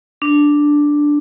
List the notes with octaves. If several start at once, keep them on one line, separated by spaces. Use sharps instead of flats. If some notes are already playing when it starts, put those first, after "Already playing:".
D4